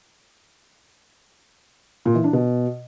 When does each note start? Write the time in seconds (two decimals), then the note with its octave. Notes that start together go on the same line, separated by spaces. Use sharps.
2.05 A#2
2.15 E3
2.24 D4
2.33 B2